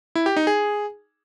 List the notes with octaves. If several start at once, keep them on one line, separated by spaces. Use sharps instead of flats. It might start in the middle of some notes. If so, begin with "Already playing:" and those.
E4
G4
D#4
G#4